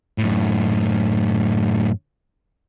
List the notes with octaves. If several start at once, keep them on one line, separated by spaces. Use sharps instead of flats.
F#2 A2